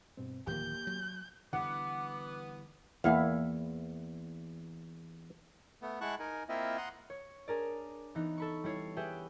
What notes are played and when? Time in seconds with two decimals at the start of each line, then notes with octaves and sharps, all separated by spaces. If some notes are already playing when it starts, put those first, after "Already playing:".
0.17 G2 B2 C4
0.47 D1 D#3 F3 A#3 G4 G6
0.87 F#3
1.53 D3 E3 G3 B3 F#5 D6
3.04 E2 A#3 E4 F5
5.82 A3 B3
6.01 G#3 E4 F#5 A5 C#6 F#6
6.19 D#4 A#4 G#5
6.49 A#3 C4 E4 F4 D#5 E5
6.77 F#5 A#5 C6 D#6
7.10 C#5
7.48 D4 G#4 A#4 D5
8.15 E3 B3 D#4
8.38 A4 B5 C#6
8.64 G3 E4 C#5 C7
8.97 G4 G#4 B4 E5 F#5 G5